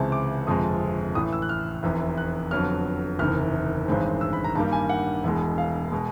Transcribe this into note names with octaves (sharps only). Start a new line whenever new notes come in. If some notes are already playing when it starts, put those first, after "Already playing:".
Already playing: C#2 C3 E3 G#3 C4 A5
D6
G1 F2 C3 F3 G#3 D#6
A1 A2 E3 D#6
E6
F#6
F6
F1 E2 C3
F#6
F2 D3 F#3 B3 F6
F#1 E2 C3 D#3 F6
A1 G2 D#3 G#3 C4
E6
B5
A#5
G2 D#3 G3 A#3 A5
G#5
F#5
E1 E2 B2 G#3
F5
B2 G#3